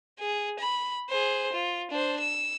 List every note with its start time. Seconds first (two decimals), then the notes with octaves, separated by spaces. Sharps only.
0.19 G#4
0.59 B5
1.09 G#4 C5
1.53 F4
1.91 D4 C5
2.20 E6